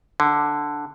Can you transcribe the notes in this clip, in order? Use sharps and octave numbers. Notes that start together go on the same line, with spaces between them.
D3